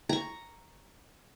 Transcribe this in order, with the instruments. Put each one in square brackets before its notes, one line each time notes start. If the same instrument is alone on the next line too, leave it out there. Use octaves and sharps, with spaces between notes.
[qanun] A#5 C#6